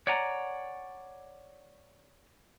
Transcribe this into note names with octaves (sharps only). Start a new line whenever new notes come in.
C#5 D5 F#5 G#5 A#5